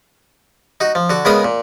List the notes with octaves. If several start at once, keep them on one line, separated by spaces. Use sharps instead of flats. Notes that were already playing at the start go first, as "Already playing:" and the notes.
D#4 F#4
F3
D3 F#4
C#3 G#3 B3 A#4 B5 D#6
A#2